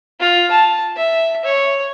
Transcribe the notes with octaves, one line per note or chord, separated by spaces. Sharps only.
F4
A5
E5
C#5